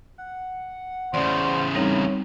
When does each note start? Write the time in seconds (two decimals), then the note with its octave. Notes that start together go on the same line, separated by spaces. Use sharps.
0.18 F#5
1.14 E2 C#3 C5 D5
1.75 G3 C4 D#4 A#4 C#5